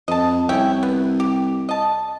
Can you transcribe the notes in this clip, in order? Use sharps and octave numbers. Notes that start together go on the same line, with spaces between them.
F2 D#5 A5
C2 C#4 E4 G5
B3
G4
D#5 A5